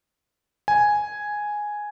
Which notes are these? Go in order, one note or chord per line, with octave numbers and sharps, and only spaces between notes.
G#5